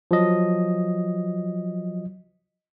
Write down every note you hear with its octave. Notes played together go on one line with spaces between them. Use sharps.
F3 F#3 D#5